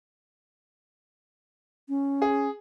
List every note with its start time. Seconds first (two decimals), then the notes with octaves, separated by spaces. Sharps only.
1.89 C#4
2.22 G#4